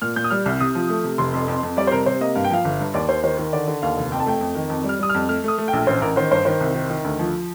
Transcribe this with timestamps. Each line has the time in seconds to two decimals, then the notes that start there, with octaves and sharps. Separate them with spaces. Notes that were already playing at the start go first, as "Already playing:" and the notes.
0.01 A#2 F6
0.16 A#2 G6
0.24 D#6
0.30 G3 F6
0.46 C2 F6
0.60 C3 D#6
0.75 F3
0.90 A3
1.04 C3
1.18 F1 C6
1.34 F2
1.48 F2
1.63 F2
1.77 G3 D5
1.87 C5
1.92 C3 A#4
2.06 C3 C5
2.21 A#3 D#5
2.35 G2 F5
2.44 G5
2.50 F3 F5
2.65 G1
2.80 G2
2.94 D#2 D5
3.09 D#2 C5
3.23 D#3 C5
3.38 D#3
3.53 D3 D5
3.68 D3
3.82 D#2 F5
3.97 F1
4.12 F2 G5
4.20 A5
4.26 A3 G5
4.41 F2
4.55 D#3
4.70 F2
4.84 G3 F6
4.99 G3 D#6
5.09 F2 F6
5.29 A3 F6
5.44 A3 D#6
5.58 A3
5.68 G5
5.73 A#1
5.87 A1 C5
6.02 A1 A#4
6.16 D#3 C5
6.31 G2 C5
6.45 D#3 C5
6.61 C2
6.74 D#3
6.90 D#3
7.04 D2
7.19 F3